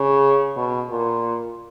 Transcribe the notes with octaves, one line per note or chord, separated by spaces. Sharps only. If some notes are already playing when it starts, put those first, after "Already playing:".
Already playing: C#3
B2
A#2